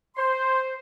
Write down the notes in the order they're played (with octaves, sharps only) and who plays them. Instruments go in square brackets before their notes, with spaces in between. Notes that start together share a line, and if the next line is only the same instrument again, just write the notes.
[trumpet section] C5 [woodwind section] C6